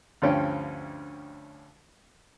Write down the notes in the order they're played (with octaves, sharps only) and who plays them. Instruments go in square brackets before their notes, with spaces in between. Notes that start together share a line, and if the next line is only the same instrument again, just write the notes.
[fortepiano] D2 G2 F3 C#4 G5